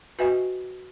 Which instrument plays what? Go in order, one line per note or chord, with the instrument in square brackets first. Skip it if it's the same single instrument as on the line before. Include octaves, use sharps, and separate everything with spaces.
[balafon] F#4 B4 D#5 E5 G5 G#5